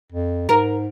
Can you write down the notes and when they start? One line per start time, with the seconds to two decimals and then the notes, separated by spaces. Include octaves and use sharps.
0.12 F2
0.49 G#2 A#4